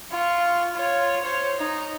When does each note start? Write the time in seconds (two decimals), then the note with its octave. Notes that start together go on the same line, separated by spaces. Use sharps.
0.11 F4 C#6
0.73 F4 C#5
1.22 C5 C#5
1.59 D#4